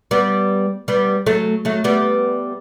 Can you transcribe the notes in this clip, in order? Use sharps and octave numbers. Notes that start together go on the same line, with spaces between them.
G3 B3
G3 B3
F#3 A3
F#3 A3
G3 B3